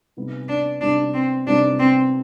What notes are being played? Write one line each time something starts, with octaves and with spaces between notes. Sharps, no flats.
C3 G3 B3 D#4
D4
C3 G3 B3 D4 D#4
C4
C3 G3 B3 D4 D#4
C4